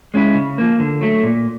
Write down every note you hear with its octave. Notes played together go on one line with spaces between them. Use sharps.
G#3 C#4 E4
C#3
F3 A#3
D3
F#3 A3
A#2